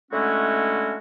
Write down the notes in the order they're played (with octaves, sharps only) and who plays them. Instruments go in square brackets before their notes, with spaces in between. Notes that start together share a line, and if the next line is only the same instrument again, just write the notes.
[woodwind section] D3 G#3 A3 C#4 E4 F#4